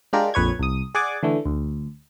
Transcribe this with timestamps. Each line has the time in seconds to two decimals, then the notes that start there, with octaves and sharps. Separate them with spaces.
0.13 G#3 D4 F4 G4 A#4
0.34 A#1 F2 B4 C#5 G#6
0.59 C2 D#6
0.95 G#4 D5 F#5 G#5 D6
1.23 D3 E3 A3
1.46 D2